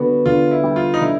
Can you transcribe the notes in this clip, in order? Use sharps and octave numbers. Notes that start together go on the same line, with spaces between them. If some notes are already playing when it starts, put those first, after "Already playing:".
Already playing: D3 G3 B3 F#4
D3 F4
E4
G3
F4
D#4
D3 E4